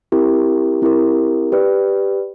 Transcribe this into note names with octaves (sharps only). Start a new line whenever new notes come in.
C4 E4 G4 A#4
C4 E4 G4 A#4
G4 B4 D5